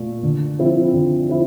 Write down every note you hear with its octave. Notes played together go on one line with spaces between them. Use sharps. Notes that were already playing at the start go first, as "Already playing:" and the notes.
Already playing: A#2 A3
D3
F3 C4 E4
D3
F3 C4 E4